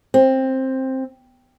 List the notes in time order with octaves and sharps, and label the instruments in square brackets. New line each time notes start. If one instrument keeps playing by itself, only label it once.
[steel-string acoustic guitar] C4